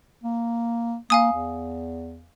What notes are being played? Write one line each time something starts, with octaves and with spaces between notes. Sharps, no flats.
A#3
A#3 F5 G#5 D#6
E2